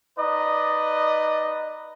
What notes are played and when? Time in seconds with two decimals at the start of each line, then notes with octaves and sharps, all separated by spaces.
0.18 D#4 B4 D5 D#5